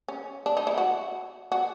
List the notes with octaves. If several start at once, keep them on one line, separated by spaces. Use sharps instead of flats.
C#4
D4
D#4
E4
F#4
F#4